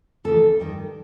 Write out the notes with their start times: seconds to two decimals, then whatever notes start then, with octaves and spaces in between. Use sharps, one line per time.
0.24 D2 C#3 E3 A4
0.60 G2 D#3 G3